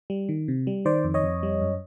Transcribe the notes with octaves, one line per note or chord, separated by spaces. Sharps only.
G3
D#3
C3
G3
D#3 C5 D5
F2
C#5 D#5
F2
G3
F#2